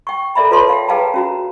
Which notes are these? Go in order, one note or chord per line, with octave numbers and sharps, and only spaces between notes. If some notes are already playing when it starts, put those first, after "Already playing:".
G5 C#6
A4 A#4 D5 E5 A#5 B5
F4 A4 B4 C#5 A5 C6
F5 G5
G#4 B4 F5 G5 A5 A#5
C#4 F#4 A#5